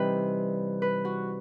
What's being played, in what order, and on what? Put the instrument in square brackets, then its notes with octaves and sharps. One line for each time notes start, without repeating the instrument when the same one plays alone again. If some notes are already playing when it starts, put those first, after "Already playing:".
Already playing: [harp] C3 E3 G3 C4 D#4 B4
B4
F#4